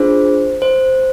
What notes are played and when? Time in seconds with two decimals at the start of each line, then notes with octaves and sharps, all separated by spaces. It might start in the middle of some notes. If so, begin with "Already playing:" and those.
Already playing: D4 F4 G#4 C5
0.62 C5